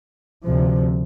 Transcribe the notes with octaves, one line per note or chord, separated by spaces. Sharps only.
D2 C3 F3